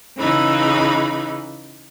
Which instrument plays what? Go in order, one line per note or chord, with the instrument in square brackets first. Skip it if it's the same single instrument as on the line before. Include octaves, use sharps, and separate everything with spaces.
[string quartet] C#3 E3 D#4 B5